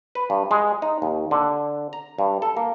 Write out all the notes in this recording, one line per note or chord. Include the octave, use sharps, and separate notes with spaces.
B4
G2
G#3
D#4
D#2
D3
A#5
G2
A4
A#3